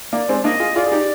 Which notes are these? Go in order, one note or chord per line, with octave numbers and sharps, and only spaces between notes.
A#3 D5
G#3 C4
A#3 D4 D#5
F4 G#4
F4 G#4 D5
G#4
D#4 G4